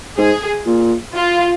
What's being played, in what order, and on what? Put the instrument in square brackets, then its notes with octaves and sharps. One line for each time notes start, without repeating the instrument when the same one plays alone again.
[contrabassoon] G#2 [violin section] G#4
[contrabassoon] A#2
[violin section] F4